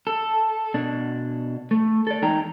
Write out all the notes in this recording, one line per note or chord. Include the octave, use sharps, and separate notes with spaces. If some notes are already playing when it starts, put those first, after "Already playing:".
A4
B2 D4
A3
A4 D5
E2 G#3 D#4 G5 A#5